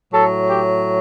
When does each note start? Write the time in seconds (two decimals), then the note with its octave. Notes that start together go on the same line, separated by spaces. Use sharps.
0.13 A2 F#3 A4
0.49 G4